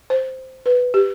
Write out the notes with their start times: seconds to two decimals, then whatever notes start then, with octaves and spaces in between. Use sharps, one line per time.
0.10 C5
0.66 B4
0.94 G4